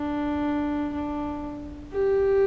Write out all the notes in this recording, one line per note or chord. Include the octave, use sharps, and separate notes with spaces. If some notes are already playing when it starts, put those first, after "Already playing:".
Already playing: D4
D4
G4